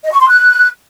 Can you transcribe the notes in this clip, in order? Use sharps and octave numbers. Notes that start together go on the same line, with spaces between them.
D#5
C#6
C6
F#6